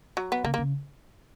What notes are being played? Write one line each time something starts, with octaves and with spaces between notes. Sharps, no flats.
F#3
B3
C#3 A#3
A#3
C#3